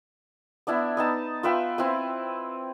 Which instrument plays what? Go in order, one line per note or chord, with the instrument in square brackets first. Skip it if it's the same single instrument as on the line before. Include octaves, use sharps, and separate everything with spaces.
[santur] B3 D4 E4 E5
B3 D#4 A5
F4 B4 E5 G5
C4 E4 B4